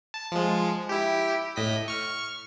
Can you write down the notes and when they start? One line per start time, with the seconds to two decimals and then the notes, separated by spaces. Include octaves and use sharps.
0.14 A5
0.32 F3 G#3
0.89 E4 G4
1.56 A2 D#5 B6
1.88 C#6 F6